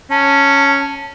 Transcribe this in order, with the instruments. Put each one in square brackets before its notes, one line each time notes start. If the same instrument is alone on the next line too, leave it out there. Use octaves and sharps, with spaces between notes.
[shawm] C#4 [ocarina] A5